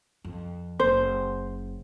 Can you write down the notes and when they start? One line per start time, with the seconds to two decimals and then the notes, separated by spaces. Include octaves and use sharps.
0.25 F2
0.80 F#1 C5